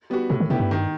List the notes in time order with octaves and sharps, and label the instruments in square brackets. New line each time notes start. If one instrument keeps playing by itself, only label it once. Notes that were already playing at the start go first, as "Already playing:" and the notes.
[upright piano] G3 B3 F#4
[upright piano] A2 [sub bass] C3
[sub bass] D#3
[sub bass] C3 [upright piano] G3 B3 E4 G4
[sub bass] G2
[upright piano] D#3